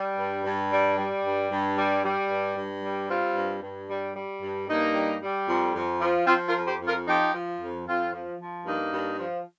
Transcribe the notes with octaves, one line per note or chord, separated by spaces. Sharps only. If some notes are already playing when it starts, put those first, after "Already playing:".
Already playing: G3
G2
G2
G3
G3
G2
G2
G3
G3
G2
G2
G3
G3 C4 F4
G2
G2
G3
G3
G2
G2 A#3 D#4
G3
G3
F2
F2
F3
F3 C4 F4
F4 A#4
F2
G4 C5
F2
F4 A#4
F3 D#4 G4
F3
F2
F2 C4 F4
F3
F3
G2 A#3 D#4
G2
F3